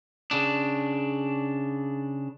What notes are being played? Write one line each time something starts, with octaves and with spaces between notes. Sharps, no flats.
C#3 D4